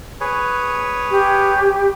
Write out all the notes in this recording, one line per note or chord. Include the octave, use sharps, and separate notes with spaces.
G#4 B4 C#5
G4